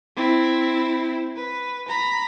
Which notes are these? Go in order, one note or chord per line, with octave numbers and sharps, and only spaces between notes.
C4 E4
B4
A#5 B5